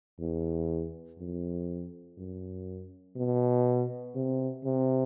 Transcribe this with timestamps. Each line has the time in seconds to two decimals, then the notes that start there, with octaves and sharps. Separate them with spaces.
0.20 E2
1.19 F2
2.18 F#2
3.16 B2
4.15 C3
4.65 C3